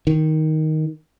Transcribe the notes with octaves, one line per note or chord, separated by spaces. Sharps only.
D#3